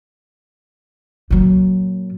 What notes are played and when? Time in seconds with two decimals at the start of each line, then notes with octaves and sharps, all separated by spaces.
1.30 A#2 F#3